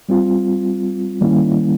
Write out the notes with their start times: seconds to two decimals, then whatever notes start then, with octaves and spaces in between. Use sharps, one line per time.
0.09 G3 C4 F4
1.21 D#3 G3 A#3 C#4 E4